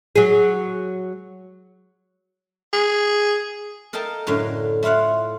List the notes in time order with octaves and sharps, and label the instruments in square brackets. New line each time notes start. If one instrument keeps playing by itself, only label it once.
[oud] F#3 G#4
[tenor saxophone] G#4
[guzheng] A4 A#4 D#5 F5 G5 A5
F#2 A2 D3 F5
A3 E4 F4 F5 F#5